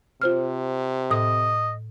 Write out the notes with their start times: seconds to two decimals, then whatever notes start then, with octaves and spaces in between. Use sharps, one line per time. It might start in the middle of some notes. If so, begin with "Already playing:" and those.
0.22 C3 F4 C5 F6
1.11 A2 D#5 D#6